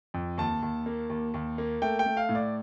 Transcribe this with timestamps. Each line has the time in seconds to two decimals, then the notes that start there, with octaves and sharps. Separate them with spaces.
0.14 F2
0.38 D#2 A5
0.62 D#2
0.86 A#3
1.10 D#2
1.34 D#2
1.58 A#3
1.82 A3 G5
1.99 G5
2.06 A3
2.17 F5
2.29 A2
2.35 D5